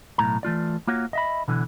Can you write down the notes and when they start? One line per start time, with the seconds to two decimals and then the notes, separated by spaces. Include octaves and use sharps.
0.18 B1 F#2 A2 A#5
0.43 E3 A3 F4 D5
0.87 A#3 F4 F#4 C#5
1.13 D#5 E5 B5
1.48 B2 D3 E3